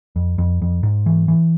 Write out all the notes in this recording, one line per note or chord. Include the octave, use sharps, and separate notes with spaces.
F2
F2
F2
G#2
E3
E3